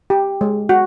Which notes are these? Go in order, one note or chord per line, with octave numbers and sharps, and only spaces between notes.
G4
G#3
F#4